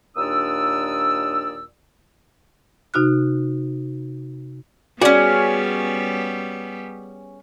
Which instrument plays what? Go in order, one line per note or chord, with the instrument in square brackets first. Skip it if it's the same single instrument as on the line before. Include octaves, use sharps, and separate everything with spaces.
[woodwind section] D#2 A#2 D4 D5 D#6 E6
[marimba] C3 D#4 F#4 F6 F#6
[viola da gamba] G3 B3 [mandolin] C#4 G#4 [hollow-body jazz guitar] F#4 D5